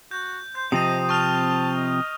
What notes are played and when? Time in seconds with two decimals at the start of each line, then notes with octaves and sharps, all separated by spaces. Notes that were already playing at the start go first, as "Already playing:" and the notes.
0.11 F#4 G6
0.55 C5 G6
0.72 C3 F3 C4 D#5 D#6 D#7
1.09 A5 C#6 F6 F7
1.76 D#5